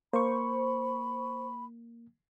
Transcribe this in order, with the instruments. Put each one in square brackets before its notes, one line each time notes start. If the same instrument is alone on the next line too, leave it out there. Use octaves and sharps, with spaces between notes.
[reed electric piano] A#3 [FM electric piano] C5 C#6 [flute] B5